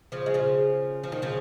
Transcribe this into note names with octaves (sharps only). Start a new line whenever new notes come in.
C#3 F3
G#3
C#3 F3
F3
D#3
C#3 F3